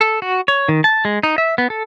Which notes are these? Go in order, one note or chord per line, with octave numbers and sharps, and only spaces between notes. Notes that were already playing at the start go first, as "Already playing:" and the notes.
A4
F#4
C#5
D#3
A5
G#3
D#4
E5
B3
A4